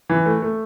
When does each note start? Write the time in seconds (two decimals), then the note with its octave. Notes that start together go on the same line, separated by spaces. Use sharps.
0.09 E3
0.26 A3
0.42 A3